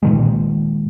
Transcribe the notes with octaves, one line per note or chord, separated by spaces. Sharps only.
A#2 D#3 G#3